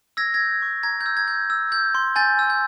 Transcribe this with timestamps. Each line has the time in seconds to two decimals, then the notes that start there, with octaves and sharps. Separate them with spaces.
0.17 E6 G#6 A#6
0.34 G#6 A#6
0.40 G6
0.62 C#6
0.83 A#5 G#6
1.01 G6
1.06 E6
1.17 G#6
1.28 G6
1.50 E6
1.72 G6
1.95 C6
2.16 G#5 G6 A6
2.39 E6
2.50 G6